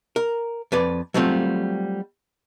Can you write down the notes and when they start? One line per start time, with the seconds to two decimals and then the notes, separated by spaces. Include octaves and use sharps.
0.16 A#4
0.72 F2 B4 D5
1.14 F#3 G3 A3 C4 F4